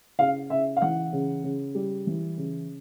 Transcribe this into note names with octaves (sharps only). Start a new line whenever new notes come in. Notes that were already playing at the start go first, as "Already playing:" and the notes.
C#3 F5
C#3 E5
F5
E3 F#5
C#3
C#3
G3
E3
C#3